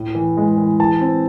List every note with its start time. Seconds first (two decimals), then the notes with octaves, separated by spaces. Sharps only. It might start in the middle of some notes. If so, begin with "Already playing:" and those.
Already playing: A2
0.15 E3
0.37 G#3
0.58 E3
0.80 E3 A5
1.01 C4